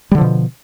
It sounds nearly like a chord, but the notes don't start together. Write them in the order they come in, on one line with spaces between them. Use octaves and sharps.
G3 D3 F3 B2